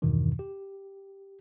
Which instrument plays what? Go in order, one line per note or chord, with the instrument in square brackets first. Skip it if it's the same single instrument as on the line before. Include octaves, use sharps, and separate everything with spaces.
[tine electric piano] E2 G2 B2 D#3 E3
G4